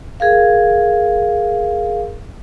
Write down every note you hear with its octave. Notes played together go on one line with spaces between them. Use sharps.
G#4 A#4 F5